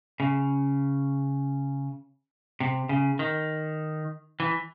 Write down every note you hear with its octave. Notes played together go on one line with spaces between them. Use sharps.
C#3
C3
C#3
D#3
E3